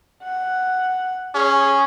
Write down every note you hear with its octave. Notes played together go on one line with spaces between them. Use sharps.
F#5
C#4 G#4